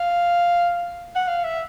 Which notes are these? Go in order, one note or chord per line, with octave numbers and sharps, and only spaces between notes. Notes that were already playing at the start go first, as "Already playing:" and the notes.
Already playing: F5
F#5
F5
E5